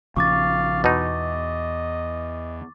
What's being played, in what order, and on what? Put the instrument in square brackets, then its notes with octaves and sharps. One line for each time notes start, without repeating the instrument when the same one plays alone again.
[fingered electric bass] A#1 C#3 F3 [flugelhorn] F5 [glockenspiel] C#6 D6 A6
[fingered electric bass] E2 [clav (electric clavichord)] B2 D#4 [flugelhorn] D#5